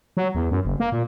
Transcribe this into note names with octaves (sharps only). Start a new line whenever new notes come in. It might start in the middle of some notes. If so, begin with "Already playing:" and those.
F#3
E2
F#2
F#1
A#3
A#2